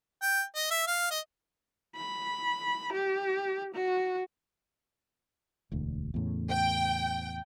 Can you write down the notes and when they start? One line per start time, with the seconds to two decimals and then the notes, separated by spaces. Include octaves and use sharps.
0.22 G5
0.56 D#5
0.71 E5
0.87 F5
1.11 D#5
1.96 B5
2.93 G4
3.75 F#4
5.72 E1 D2
6.14 E2 A2 C#3
6.50 G5